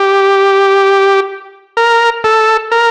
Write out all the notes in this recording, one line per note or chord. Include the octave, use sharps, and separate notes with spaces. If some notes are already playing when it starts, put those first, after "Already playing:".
Already playing: G4
A#4
A4
A#4